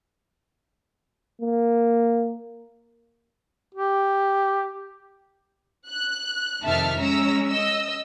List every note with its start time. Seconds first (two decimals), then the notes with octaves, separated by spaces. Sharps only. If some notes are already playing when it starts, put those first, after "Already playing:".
1.42 A#3
3.75 G4
5.90 F#6
6.64 F2 C3 D#3 E5 A5 F6
6.99 G#3 C#4 A#5 E6
7.47 D#5 E6